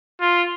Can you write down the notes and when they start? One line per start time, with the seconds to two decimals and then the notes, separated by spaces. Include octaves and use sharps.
0.21 F4